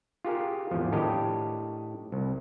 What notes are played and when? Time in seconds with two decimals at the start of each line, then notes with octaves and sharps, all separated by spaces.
0.25 F4 G4 G#4 A#4
0.71 G#1 E2 F3
0.92 A2 D4 G4 A#4 D#5
2.12 C2